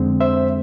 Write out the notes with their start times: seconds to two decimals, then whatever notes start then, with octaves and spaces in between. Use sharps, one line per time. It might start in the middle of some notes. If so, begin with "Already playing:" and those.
Already playing: F2 D3 G#3 C4
0.21 C5 E5